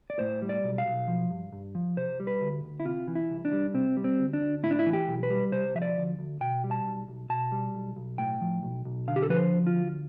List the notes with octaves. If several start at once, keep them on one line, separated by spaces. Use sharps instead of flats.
D5
A2 C5
G3
D5
B1
F5
B1
F3
G2
G2
F3
C3 C5
G3
B4
D2
D2
E4
C3 F4
E3
E4
C2
D4
G3
C3 C4
G3
C4
D2
D4
D2
A2 E4
D4
E4
E3
G4
B1
B4
G3
C3 C5
F3 E5
D5
D2
D2
B2 G5
G3
A5
B1
B1
B2 A5
G3
B1
B1
A2 G5
F3
B1
B1
D3 F5
G4
A4
F3 B4
C5
D2
F4
D2